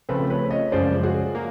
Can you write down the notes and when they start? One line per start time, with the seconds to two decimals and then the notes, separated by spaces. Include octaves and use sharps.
0.09 C#3 F3 A3 C4 A4 B4
0.30 B4 C#5
0.51 C#5 D#5
0.72 F#2 C#3 F3 G#3 C#4 C5 D5
1.03 F#4 G#4
1.35 A#3